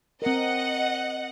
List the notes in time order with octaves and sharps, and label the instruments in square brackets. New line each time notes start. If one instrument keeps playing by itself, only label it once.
[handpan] C4 A#4 [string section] D#5 F#5